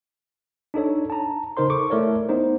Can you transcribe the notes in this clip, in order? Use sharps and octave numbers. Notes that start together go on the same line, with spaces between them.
D4 D#4 A4 C#5
A5 A#5
C#3 D#4 A#4 C5 C6
A4 C#6 D6
A3 E4 A#4 C#5 D5
B3 D#4 C5